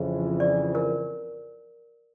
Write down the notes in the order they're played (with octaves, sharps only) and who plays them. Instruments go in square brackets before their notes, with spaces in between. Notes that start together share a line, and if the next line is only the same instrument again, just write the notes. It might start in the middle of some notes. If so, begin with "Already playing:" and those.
Already playing: [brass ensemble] F2 C#3 E3
[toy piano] D5
A#4